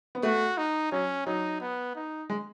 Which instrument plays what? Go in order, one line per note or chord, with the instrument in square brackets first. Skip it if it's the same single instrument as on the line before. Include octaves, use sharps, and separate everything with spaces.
[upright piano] B3
[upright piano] A3 [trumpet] F#4
[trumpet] D#4
[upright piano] F#3 [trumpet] C#4
[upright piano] F#3 [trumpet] D#4
[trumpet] B3
D#4
[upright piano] G#3